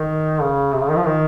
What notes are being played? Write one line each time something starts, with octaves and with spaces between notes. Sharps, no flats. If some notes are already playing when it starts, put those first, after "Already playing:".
Already playing: D#3
C#3
C3
C#3
D#3
F3
D#3